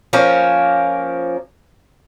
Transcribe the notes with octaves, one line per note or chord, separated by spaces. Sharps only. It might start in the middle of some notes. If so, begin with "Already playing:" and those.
F3 A#3 C#4